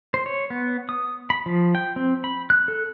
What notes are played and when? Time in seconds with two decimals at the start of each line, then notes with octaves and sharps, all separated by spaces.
0.14 C5
0.26 C#5
0.50 B3
0.89 D#6
1.30 B5
1.46 F3
1.75 G5
1.96 C4
2.24 B5
2.50 F#6
2.68 A4